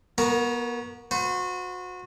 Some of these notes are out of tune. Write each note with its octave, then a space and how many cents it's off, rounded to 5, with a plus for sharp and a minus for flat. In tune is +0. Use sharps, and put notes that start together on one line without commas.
B3 -30 F#4 +0 A#4 +0
F#4 -30 C5 -45